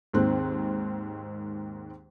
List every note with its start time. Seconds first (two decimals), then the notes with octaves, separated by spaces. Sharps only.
0.13 D#2 G#2 D#3 C4 F#6